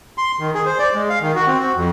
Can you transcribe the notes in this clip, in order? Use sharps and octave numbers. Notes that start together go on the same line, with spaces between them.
C6
D#3
G#4
C5
D5
G#3
F5
D#3
F#4
C4
F#4
F2